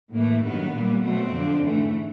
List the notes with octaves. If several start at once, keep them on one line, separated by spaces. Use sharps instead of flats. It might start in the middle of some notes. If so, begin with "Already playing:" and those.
A2 E3 A3 A#3
G2 D#3 F#3 B3
A#2 G3 A#3
B2 F#3 A3 C4
F2 D3 F3
G#2 E3 A3